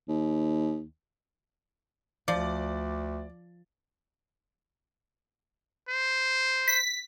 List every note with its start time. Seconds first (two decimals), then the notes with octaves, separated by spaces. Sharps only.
0.09 D#2
2.28 D2 F3 D5
5.89 C5
6.68 B6